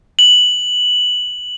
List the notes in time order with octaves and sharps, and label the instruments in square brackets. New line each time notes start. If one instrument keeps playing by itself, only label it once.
[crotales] F#7